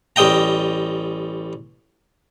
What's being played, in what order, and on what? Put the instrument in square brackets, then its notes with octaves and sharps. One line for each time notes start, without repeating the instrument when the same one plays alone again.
[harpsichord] A1 G3 D#5 G5 A#5